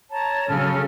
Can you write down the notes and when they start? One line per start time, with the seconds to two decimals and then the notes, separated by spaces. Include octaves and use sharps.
0.11 C#5 A5 A#5
0.49 C#3 F#3 A4 F6